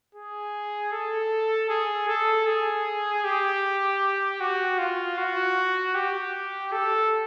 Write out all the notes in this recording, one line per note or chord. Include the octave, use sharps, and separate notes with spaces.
G#4
A4
G#4
A4
G#4
G4
F#4
F4
F#4
G4
A4